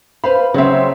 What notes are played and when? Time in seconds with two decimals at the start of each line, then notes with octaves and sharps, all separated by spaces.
0.24 B4 C5 F5 B5
0.54 C#3 F#3 C4 C5 E5